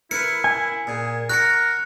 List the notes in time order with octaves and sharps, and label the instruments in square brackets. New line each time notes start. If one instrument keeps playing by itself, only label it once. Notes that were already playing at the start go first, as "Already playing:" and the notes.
[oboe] E4 [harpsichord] A#4 B4 [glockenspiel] C#7
[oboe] E4 [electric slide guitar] G#5
[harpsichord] A#2 [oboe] G#4
[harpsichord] F#4 A#5 [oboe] A#4 [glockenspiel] F#6 C#7